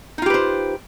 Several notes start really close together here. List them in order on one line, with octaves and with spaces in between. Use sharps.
D#4 F4 G4 B4 C5